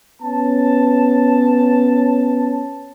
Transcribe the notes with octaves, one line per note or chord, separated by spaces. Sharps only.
B3 C#4 A5